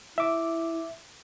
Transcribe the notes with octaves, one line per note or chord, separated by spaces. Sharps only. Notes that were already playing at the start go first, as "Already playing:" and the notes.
E4 E5 D6